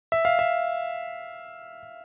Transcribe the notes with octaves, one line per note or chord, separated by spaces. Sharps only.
E5
F5
E5